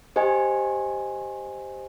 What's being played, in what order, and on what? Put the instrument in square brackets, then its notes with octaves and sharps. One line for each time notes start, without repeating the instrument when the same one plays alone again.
[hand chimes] G4 C5 D#5 G#5